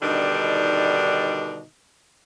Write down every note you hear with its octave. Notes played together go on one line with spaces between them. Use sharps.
B2 D3 D#3 G3 D4 D#4